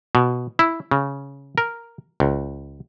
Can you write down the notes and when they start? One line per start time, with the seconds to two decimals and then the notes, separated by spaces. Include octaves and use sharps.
0.15 B2
0.59 E4
0.91 C#3
1.58 A#4
2.20 C#2